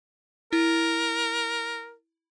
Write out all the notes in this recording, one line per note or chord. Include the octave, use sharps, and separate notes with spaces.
E4 A#4